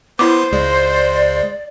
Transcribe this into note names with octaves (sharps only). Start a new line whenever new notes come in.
B3 E4 C5 C6 D6
C#2 G#3 D5